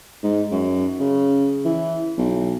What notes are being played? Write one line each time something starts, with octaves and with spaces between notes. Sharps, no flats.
G#2
F#2
C#3
E3
B1